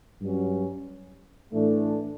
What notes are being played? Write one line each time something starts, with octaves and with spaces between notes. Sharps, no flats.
G2 F#3 C#4
A2 E3 A3 D4